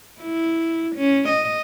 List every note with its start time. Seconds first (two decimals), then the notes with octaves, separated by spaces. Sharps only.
0.21 E4
0.96 C#4
1.29 D#5